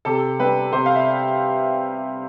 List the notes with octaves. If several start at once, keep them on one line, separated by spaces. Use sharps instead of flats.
C3 A4
G3 B3 D4 B4
C3 C5
F5
E5